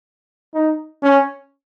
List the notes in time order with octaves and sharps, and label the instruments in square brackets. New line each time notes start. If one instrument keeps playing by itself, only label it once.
[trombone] D#4
C#4